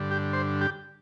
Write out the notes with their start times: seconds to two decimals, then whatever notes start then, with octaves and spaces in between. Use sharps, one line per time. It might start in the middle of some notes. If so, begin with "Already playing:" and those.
Already playing: G2 D3
0.11 G4
0.33 C5
0.61 G4